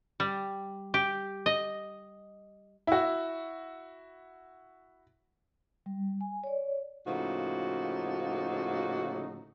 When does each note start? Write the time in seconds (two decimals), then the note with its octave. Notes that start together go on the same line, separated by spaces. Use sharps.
0.20 G3
0.94 G4
1.46 D#5
2.87 E4 F#4
5.86 G3
6.21 G#5
6.44 C#5 D5
7.07 A2 C#3 F3 A#3 D#4 F#4